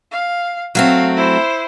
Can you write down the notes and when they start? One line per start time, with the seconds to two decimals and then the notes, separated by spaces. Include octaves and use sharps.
0.12 F5
0.75 F#3 A3 C4 F5
1.16 E4 C5